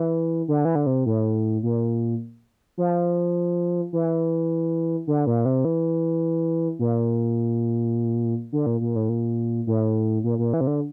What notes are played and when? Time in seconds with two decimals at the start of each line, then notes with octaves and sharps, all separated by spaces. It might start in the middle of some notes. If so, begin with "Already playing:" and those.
Already playing: E3
0.48 D3
0.65 E3
0.75 D3
0.86 C3
1.06 A2
1.63 A#2
2.78 F3
3.93 E3
5.07 D3
5.27 A#2
5.45 C3
5.65 E3
6.79 A#2
8.52 D3
8.66 A#2
8.81 A#2
8.95 A2
9.09 A#2
9.67 A2
10.24 A#2
10.38 A#2
10.53 E3
10.61 C3
10.67 D3